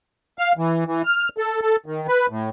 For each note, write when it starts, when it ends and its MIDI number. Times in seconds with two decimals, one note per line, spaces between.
0.39 0.52 77
0.57 0.84 52
0.87 1.02 52
1.05 1.29 89
1.38 1.60 69
1.61 1.76 69
1.86 2.07 51
2.08 2.27 71
2.30 2.49 45